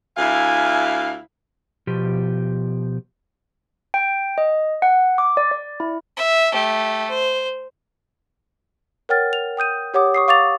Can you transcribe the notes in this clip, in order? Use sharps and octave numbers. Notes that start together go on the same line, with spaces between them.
D2 E4 F5 G#5
B2 F3 G4
G5
D#5
F#5
D6
D5
D5
E4
E5
A3 G4
C5
A#4 C#5 F#5 G5 F6 A6
F7
G5 D#6 G6 D#7
G4 C#5 F#5 D6 D#6
C#6 D#6 C7
F5 C#6 D6 A6 F7